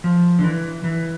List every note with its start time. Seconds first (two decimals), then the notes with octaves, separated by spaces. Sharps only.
0.04 F3
0.39 D3
0.44 E3
0.84 E3